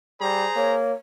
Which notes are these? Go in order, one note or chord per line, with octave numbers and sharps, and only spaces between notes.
G3 G#4 C5 A#5
A#3 C#5